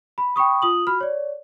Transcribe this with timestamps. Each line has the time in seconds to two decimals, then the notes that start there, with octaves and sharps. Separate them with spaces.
0.18 B5
0.36 G5 B5 C#6 D#6
0.62 F4 D#6 F#7
0.87 F#4 B5 F6
1.01 C#5 D5